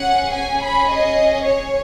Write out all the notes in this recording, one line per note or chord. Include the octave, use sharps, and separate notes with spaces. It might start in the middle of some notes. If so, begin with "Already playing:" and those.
Already playing: C#4 G#4 F#5
G#5
B5
D#5
C#5